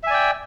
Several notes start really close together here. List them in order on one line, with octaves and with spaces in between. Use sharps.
E5 G#5 D5 G5